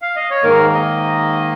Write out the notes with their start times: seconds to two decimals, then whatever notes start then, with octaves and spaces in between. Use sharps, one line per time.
0.02 F5
0.16 D#5
0.30 C#5
0.44 G#2 D#3 A#3 A#4
0.74 D#5